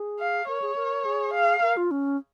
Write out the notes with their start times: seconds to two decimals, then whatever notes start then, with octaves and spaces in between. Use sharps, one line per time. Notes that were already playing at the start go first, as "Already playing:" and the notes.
Already playing: G#4
0.20 F5
0.48 A#4 C#5
0.62 G#4
0.76 A#4
1.05 G#4
1.33 F5
1.62 A#4
1.77 F4
1.91 C#4